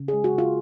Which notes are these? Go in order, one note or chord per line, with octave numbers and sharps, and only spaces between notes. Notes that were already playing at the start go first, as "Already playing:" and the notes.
Already playing: C#3
G#3 G#4
F#4
C#3 F4